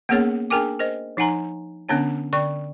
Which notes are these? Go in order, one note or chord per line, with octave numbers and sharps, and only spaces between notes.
A#3 B3 C#4 G#4 A#4 C#5
D4 G#4 A#4 G5 G#5 D6
A#4 C5 D#5
F3 D#4 F#5 G#5 A#5 C6
D3 B3 C#4 D4 C#5 G#5
D3 D5 G5 C#6